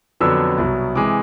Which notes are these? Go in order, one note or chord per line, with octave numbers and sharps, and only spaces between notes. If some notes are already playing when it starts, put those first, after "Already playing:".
F2 D3 F#3 B3 D4 E6
C2 B2 F#3
C3 E3 G#3 D6